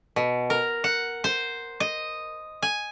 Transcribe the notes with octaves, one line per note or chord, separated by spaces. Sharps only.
B2
A#4
F#5
C5
D#5
G#5